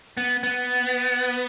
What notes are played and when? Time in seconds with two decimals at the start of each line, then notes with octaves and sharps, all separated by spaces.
0.17 B3
0.43 B3